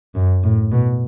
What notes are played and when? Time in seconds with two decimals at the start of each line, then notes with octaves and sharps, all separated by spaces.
0.15 F#2
0.44 A2
0.72 B2